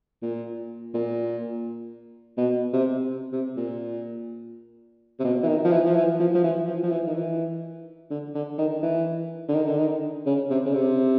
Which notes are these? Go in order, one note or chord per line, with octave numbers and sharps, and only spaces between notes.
A#2
A#2
B2
C3
C3
A#2
C3
B2
E3
D#3
F3
E3
F3
E3
F3
F3
E3
F3
F3
E3
D#3
E3
D3
D3
D#3
E3
D3
D#3
D3
D#3
C#3
C3
C#3
C3